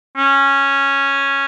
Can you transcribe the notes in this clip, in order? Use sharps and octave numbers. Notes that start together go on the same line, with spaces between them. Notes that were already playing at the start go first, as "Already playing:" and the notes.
C#4